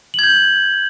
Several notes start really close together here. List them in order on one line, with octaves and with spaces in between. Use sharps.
F#7 G#6 G6